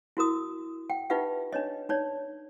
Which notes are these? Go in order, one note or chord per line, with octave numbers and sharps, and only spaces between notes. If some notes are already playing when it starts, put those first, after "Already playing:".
E4 F#4 A#4 D#6
F#5 G5
D#4 F4 G4 B4 E5 F#5
D4 D#4 C#5 D#5
D#4 C#5 D5